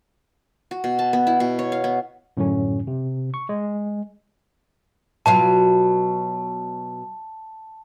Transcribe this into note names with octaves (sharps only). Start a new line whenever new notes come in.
F#4
B2
A5
B3
E4
B2
C#5
F5
B3
F#2 A2 D3 F#3 C#4
C3
C#6
G#3
B2 F#3 F4 A5